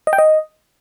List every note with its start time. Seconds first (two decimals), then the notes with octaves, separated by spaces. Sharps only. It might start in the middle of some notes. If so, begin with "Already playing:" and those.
0.07 D#5
0.13 G5
0.18 D#5